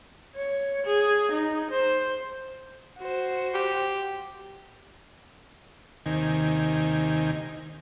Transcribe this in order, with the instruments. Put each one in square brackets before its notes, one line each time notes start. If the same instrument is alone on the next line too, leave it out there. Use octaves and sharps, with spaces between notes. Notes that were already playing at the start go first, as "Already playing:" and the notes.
[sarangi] C#5
G#4
D#4
C5
[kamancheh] F#4 C5
[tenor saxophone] G4
[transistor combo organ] D#2 C3 D#3 G#5